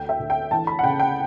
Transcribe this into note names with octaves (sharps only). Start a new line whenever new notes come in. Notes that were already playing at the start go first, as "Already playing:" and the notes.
Already playing: D2 G5
E5
D2
G5
E3 A5
B5
F#5
C#3 G5
G5